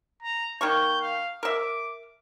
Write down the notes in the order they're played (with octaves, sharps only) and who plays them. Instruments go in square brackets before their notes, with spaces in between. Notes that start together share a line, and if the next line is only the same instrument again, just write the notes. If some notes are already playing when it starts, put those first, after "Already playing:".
[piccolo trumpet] A#5
[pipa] D#3 A#3 C#6 [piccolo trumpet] G6
[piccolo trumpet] F5
[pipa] A#4 E5 [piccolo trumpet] D6